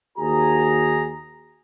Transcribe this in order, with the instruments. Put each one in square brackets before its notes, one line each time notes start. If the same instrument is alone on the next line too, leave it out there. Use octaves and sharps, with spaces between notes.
[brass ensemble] D#2 F#4 G#4 A#5